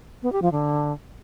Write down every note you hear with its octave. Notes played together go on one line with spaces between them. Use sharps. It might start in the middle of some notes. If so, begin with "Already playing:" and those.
B3
G4
F3
D3